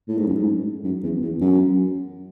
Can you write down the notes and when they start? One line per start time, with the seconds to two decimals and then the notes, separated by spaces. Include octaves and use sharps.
0.08 A2
0.17 G#2
0.27 F#2
0.35 G#2
0.84 F#2
1.03 E2
1.22 E2
1.41 F#2